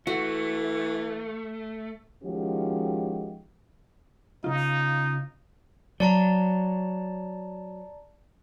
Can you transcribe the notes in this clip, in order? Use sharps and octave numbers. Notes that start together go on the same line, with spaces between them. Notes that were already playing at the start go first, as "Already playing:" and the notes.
E3 A3 F#4
D#3 F3 G#3 C#4 F#4 G4
C#3 D#4 F4
F#3 D5 A5 A#5